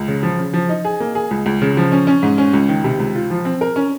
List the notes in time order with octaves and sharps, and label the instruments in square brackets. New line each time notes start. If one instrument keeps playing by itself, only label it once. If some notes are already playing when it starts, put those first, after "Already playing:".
Already playing: [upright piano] C#2
C#3
F3
C#3
F3
D#4
G#4
A#3
G#4
C#2
C#2
C#3
F3
C#4
C#4
G#2
C#4
C#2
D#3
C3
C#2
F4
F3
C4
A#4
C#4